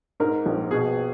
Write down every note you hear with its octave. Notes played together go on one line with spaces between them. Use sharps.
G#2 A#4
A#1
B2 G#4